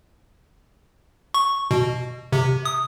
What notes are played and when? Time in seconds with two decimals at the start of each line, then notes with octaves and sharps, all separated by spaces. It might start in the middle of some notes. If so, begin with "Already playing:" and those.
1.34 C#6
1.71 B2
2.32 C3
2.65 D#6